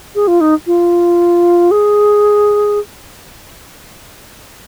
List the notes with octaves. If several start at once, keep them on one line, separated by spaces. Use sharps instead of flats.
G#4
F4
D#4
F4
G#4